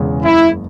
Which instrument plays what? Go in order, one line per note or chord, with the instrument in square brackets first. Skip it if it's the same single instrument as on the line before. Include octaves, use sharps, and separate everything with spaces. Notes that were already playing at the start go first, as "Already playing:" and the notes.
Already playing: [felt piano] E1 E2 C#3 G#3 C#4
[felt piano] F#1 [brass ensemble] E4